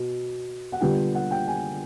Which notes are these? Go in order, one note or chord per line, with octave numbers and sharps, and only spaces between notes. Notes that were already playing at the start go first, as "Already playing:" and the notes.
Already playing: B2
F#5
D3 G3 B3 D4 F4 G5
F#5
G5
G#5